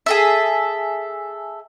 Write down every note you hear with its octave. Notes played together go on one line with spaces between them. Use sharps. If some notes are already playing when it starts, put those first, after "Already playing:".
G#4 A4 E5